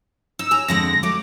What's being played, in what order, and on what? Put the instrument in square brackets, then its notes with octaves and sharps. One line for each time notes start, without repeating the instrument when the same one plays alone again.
[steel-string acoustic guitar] D#4 [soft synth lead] E6
[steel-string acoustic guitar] C#5 G#5 A#5
[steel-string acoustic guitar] F2 D3 G#3 [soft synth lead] A#6
[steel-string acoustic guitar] F#3 A3 [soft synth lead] D6